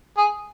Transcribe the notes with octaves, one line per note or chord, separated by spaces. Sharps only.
G#4